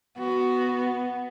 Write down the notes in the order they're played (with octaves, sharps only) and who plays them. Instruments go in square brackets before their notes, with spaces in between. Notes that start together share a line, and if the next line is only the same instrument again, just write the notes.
[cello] B3 [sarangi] F#4